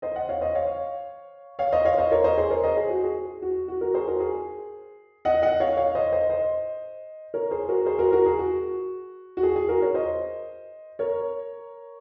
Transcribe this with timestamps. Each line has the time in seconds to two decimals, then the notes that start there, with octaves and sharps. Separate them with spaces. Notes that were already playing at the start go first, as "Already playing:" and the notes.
0.02 C5 D#5
0.16 D#5 F#5
0.29 C#5 F5
0.41 C5 D#5
0.55 C#5 F5
1.59 C#5 F5
1.72 C5 D#5
1.85 C#5 F5
1.98 C5 D#5
2.12 A#4 C#5
2.24 C5 D#5
2.37 G#4 C5
2.50 A#4 C#5
2.64 C5 D#5
2.77 G#4
2.90 F#4
3.03 G#4
3.42 F#4
3.68 F#4
3.81 F#4 A#4
3.94 G#4 C5
4.07 F#4 A#4
4.20 G#4
5.25 D#5 F#5
5.42 D#5 F#5
5.60 C#5 F5
5.77 C#5 F5
5.95 C5 D#5
6.12 C5 D#5
6.30 C5 D#5
7.34 A#4 C#5
7.51 G#4 C5
7.69 F#4 A#4
7.86 G#4 C5
7.99 F#4 A#4
8.12 F#4 A#4
8.26 G#4
8.39 F#4
9.37 F#4
9.43 G#4
9.56 G#4
9.69 F#4 A#4
9.82 A#4 C#5
9.94 C5 D#5
10.99 A#4 C#5